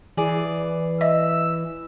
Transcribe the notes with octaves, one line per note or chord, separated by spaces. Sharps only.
E3 G#4 D5
D#5 E5 E6